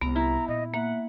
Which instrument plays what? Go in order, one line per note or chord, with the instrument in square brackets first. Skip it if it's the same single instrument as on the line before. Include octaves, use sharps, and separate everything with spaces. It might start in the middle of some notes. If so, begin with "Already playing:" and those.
[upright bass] C2 [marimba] B3 [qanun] A#5
[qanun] E4 [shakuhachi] A#5
[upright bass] A#2 [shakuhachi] D#5
[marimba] A#3 [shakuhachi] E5 [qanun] F#5